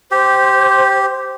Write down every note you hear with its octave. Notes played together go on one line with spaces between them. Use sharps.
G4 C5